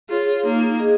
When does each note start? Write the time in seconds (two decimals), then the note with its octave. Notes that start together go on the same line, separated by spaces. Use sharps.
0.09 F4 G#4 C#5
0.45 A#3 D#4
0.80 G#4 D#5